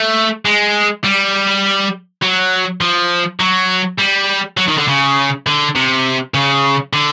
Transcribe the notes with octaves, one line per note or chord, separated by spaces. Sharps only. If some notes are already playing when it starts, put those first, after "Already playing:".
Already playing: A3
G#3
G3
F#3
F3
F#3
G3
F#3
D#3
D3
C#3
D3
C3
C#3
D3